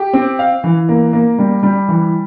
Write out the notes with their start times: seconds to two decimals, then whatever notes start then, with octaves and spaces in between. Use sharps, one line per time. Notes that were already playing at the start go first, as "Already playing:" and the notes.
Already playing: G4
0.13 C4
0.39 F5
0.64 E3
0.89 A#3
1.13 A#3
1.38 G3
1.63 G3
1.88 E3